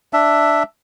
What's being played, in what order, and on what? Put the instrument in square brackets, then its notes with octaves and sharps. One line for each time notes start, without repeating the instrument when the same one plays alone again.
[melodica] D4 E5